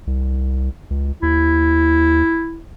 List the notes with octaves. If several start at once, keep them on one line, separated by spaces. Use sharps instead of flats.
C2
C#2
D#2 E4